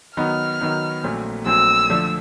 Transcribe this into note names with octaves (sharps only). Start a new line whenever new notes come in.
D#3 F#3 B3 D#4 F6
D#3 F#3 B3 D#4
A#1 A#2 F#3 A3 C4
A#1 A#2 F#3 A3 C4 E6
D3 F3 A3 D4